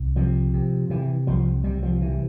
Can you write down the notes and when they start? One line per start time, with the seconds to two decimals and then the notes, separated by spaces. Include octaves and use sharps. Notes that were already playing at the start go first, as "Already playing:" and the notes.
Already playing: C2
0.16 C3 F3
0.54 C3
0.90 C3 E3
1.27 C2 F3
1.64 C3 G3
1.83 F3
2.01 C3 E3